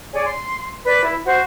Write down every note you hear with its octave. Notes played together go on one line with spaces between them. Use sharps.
G#4 C#5 D5 G#5
C6
B4 D5 B5
E4
F#4 C5